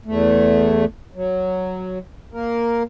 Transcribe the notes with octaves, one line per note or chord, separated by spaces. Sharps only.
E2 A3
F#3
A#3 A#4